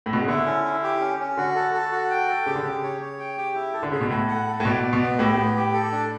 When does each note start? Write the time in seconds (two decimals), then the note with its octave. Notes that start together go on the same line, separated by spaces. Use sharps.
0.06 A2
0.13 B2
0.21 C#3
0.28 D3 E4
0.46 C#4
0.64 E4
0.83 G4
1.00 C#4
1.20 C#4
1.37 D3 F#4
1.55 A4
1.74 A4
1.92 F#4
2.10 G5
2.28 A4
2.46 C#3 G4
2.55 D3
2.63 C#3 G4
2.84 C#5
3.01 C#5
3.19 G5
3.38 G4
3.56 E4
3.74 A4
3.83 D3
3.92 C#3 A4
4.01 B2
4.10 A2 A4
4.28 F#5
4.47 A4
4.60 A2
4.65 B2 D5
4.83 D5
4.93 B2
5.02 B3
5.19 A2 G4
5.34 A2 B3
5.57 G4
5.74 A4
5.92 D4